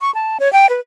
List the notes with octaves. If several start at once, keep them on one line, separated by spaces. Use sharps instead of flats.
C#6
A5
C#5
G5
B4